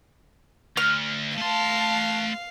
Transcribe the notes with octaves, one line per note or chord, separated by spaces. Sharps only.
D2 F6
A3 F5 A5 C6